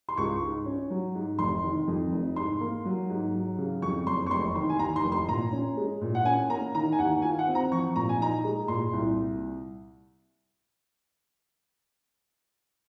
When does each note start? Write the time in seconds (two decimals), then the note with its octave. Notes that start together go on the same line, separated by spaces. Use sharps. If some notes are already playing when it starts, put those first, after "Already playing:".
0.09 C6
0.17 C#2 C#6
0.42 G#2
0.66 C#4
0.90 F#3
1.15 G#2
1.39 F1 C6
1.63 D#3
1.88 F2
2.12 F1
2.36 G#2 C6
2.61 A#3
2.85 F#3
3.10 G#2
3.34 F#3
3.58 C#3
3.82 F2 C#6
4.06 F#1 C6
4.26 C#6
4.31 F1 C6
4.55 D#3 C6
4.70 G#5
4.79 D#2 A#5
4.96 C6
5.04 F1
5.12 C6
5.28 A#2 A#5
5.52 C#4
5.77 G#3
6.02 A#2
6.15 F#5
6.25 C#4 G#5
6.50 A#3 A#5
6.74 D#3 A#5
6.92 G#5
6.99 D#2 F#5
7.22 F4 G#5
7.39 F#5
7.47 C4
7.55 A#5
7.72 F3 C#6
7.96 A#2 A#5
8.09 G#5
8.20 D#4 A#5
8.44 G#3
8.68 A#2 C6
8.93 C2